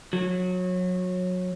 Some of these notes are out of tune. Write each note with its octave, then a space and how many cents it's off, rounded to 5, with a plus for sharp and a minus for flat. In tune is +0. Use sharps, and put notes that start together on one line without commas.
F#3 -25